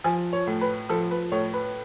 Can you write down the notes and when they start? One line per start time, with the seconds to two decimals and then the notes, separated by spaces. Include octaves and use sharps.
0.04 F3 G#5
0.33 C#5
0.47 A2
0.61 B4
0.89 F3 A4
1.11 B4
1.32 A2 C#5
1.54 B4